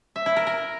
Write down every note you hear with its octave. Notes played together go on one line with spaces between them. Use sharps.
E5
E4
A#4
A#4